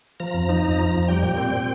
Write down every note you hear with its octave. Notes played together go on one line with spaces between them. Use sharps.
F3 A#5
F2
D#4
F2
F3
F2
A#5
G3 G5
A#2
C4
A#2